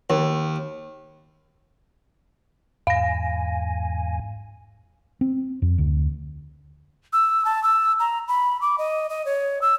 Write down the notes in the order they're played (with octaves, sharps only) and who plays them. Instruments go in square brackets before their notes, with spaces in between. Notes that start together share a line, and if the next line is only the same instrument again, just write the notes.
[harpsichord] D#2
[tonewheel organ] E2 G#2 G#5 [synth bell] F5 A#6
[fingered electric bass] C4
F2
D2
[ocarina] E6
A5
E6
A#5
B5
D6
D#5
D#5
C#5
E6